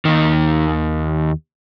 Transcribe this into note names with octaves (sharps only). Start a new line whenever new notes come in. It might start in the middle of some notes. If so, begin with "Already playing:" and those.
D#2 D#3